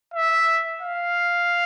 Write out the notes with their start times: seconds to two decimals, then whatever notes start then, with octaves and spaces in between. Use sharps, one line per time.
0.14 E5
0.82 F5